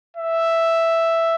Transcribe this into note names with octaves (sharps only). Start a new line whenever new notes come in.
E5